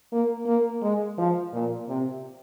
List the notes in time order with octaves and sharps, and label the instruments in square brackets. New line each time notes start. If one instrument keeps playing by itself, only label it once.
[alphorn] A#3
A#3
G#3
F3
A#2
C3